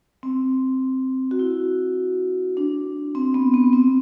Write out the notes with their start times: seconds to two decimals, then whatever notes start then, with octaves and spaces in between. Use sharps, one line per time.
0.23 C4
1.31 F#4
1.39 E4
2.57 D4
3.15 C4
3.34 B3
3.54 B3
3.73 C4